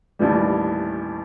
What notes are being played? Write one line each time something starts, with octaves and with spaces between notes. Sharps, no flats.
A1 D#2 A2 E3 G3